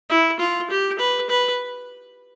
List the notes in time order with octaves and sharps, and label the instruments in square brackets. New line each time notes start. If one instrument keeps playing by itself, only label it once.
[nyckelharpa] E4
F4
G4
B4
B4